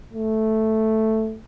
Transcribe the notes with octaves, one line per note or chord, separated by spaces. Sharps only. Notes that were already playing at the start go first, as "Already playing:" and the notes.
A3